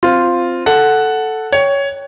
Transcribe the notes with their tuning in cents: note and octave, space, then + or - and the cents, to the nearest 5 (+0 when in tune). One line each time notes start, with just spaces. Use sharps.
C4 +0 F4 +0
A4 +0 F#5 +0
C#5 +10 G5 +0